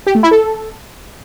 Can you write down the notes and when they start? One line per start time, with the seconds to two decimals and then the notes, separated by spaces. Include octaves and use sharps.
0.07 G4
0.15 A3
0.23 E4
0.31 A4